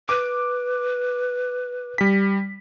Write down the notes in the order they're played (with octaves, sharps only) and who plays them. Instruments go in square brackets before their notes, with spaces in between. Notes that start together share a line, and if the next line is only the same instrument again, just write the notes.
[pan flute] B4 [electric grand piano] D6
[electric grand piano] G3 B6